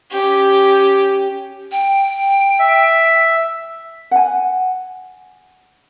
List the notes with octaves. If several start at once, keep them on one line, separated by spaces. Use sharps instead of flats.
C#4 G4
G5
E5
F#5 G#5